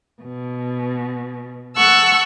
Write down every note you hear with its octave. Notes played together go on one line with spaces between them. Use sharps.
B2
F#5 A5 C#6 E6 F#6